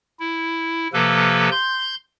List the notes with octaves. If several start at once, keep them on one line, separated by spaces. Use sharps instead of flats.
E4
C3 F3 A#3 A4 B4
C6 G6